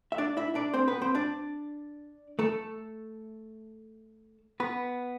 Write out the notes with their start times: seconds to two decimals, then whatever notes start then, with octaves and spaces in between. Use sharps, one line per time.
0.12 E5
0.18 D4 D5
0.37 E4 E5
0.55 D4 D5
0.74 C4 C5
0.88 B3 B4
1.02 C4 C5
1.15 D4 D5
2.39 A3 A4
4.60 B3 B4